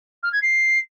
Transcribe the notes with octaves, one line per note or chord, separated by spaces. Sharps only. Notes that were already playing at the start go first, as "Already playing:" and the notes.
F6
G#6
C7